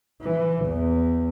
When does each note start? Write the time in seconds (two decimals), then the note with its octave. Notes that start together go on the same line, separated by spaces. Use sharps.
0.22 E3
0.66 E2